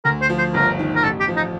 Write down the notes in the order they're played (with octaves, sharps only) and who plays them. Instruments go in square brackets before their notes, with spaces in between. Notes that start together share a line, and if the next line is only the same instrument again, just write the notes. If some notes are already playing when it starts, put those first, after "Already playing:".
[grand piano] D2 [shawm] A#4
[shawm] C5
[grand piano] F3
[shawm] C5
[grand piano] G1 [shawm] A#4
[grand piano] D#3
[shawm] A#4
[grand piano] A1 [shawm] A4
[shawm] G4
[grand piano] F3
[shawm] D#4